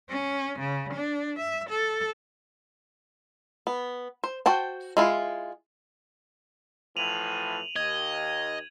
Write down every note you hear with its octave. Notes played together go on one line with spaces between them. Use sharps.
C#4
C#3
D4
E5
A4
B3
C5
F#4 C5 G5 A5
G#3 E4 F4
A2 E3 F3 D#7 F7 F#7
D#2 D#5 G#6